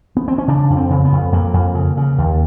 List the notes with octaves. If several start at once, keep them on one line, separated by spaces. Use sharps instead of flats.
B3
C4
C#4
C#3 D4
F2
C4
C#3
B3
F2
F2 A#3
F2
C#3
C#3
D#2